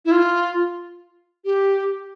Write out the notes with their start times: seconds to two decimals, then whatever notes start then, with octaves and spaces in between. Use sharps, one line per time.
0.05 E4
0.11 F4
1.45 G4